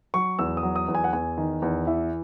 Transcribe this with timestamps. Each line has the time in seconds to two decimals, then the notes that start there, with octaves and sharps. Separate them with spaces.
0.14 F#3 C#6
0.39 E2 E6
0.57 D#6
0.63 F#3
0.76 D#6
0.88 E2
0.95 G#5
1.04 F#5
1.13 E2 G#5
1.38 D#3
1.62 E2
1.87 E3 E5